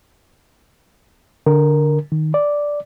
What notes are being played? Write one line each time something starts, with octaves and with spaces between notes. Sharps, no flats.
D3 A#4
D#3
D5